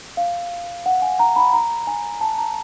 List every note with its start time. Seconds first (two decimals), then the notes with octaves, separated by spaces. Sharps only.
0.17 F5
0.86 F#5
1.02 G#5
1.19 A#5
1.36 B5
1.53 A#5
1.87 G#5
2.21 A5
2.38 A#5